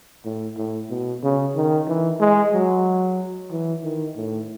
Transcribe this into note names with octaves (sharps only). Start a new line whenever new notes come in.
A2
A2
B2
C#3
D#3
E3
G#3
F#3
E3
D#3
A2